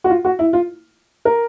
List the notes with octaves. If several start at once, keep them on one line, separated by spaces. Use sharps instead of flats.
F#4
F4
F#4
E4
F4
A#4